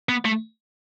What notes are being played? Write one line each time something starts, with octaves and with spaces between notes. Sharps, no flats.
B3
A3